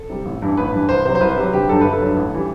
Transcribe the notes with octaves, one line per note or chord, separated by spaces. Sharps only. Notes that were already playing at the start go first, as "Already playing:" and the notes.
Already playing: A4
C3 G3
A1
G2 E3
A1 B4
G2 E3
C2 C5
C3 F#3 C5
C5
C2 B4
C3 F#3
G1 G4
G2 F#3 A4
G1 B4
A4
G2 F#3
A1
E3 G3